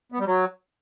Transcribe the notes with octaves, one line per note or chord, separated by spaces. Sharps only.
B3
G3
F#3